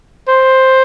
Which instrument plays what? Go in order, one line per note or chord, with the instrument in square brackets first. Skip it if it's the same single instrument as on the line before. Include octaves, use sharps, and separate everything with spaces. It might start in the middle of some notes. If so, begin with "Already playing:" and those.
[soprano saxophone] C5